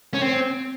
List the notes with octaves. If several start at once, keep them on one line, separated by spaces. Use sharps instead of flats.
C#4
C4